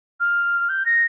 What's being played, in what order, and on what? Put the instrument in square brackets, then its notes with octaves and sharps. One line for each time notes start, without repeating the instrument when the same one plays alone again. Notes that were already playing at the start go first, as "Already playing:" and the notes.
[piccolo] F6
G6
A#6